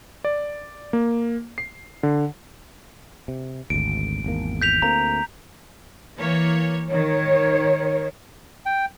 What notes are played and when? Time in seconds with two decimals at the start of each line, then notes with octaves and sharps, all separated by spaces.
0.24 D5
0.93 A#3
1.58 C7
2.03 D3
3.28 C3
3.70 G#1 D2 D7
4.24 G#1 E2 A#3
4.62 G6 B6 F7
4.82 D2 A#3 C4 A#5
6.16 E3 A#3 C#5
6.89 D#3 C#5
8.66 G5